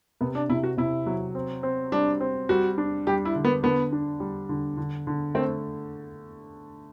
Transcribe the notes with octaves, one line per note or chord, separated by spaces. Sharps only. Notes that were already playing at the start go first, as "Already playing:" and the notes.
C3 B3
D4
C3 E4
F#4
C3 E4
F#3
C4
C4
G3 D4
C4
G3 F#4
D4
G3 G4
E4
D3
B3
D3 B3
D4
G3
D3
D3
D3
A3 C4